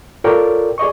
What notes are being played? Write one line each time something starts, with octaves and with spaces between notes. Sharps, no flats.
F4 A4 A#4 C#5 D5 G5
G#4 D5 D#5 C#6